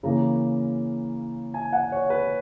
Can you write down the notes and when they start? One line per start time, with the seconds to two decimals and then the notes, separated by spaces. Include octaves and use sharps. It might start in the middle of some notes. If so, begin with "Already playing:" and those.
0.03 C#3 E3 A#3 A#5
1.54 G#5
1.73 F#5
1.92 C#5
2.10 B4